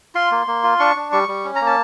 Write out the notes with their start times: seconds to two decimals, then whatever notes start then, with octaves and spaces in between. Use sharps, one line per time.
0.15 F4 C6
0.31 A#3
0.47 A#3
0.63 F4
0.80 D4 C#6
0.96 D4
1.12 G3 C#6
1.28 G3
1.45 C#4
1.56 A#5
1.61 A#3
1.66 A5